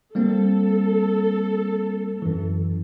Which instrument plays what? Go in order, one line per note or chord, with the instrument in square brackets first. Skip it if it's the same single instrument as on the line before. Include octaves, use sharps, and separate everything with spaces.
[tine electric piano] G3 A#3 C4 [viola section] A4
[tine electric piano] F#2 E3